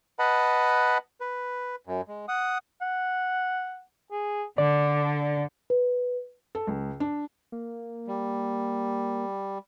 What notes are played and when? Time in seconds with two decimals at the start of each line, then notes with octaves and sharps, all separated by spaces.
0.19 B4 D#5 F#5 A5 B5
1.21 B4
1.87 F#2
2.08 G#3
2.28 F#5 D#6
2.82 F#5
4.11 G#4
4.58 D3 D4 D5
5.70 B4
6.55 A4
6.67 C#2
7.00 D4
7.52 A#3
8.07 G3